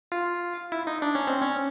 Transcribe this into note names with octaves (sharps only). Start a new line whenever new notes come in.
F4
E4
D#4
D4
C#4
C4
C#4